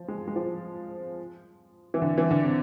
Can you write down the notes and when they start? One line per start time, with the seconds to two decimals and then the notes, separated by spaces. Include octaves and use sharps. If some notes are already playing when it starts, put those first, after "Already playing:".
Already playing: F3
0.08 G#3
0.28 G#3
0.36 F3
1.94 E3
2.02 D3
2.18 E3
2.31 D3
2.43 C3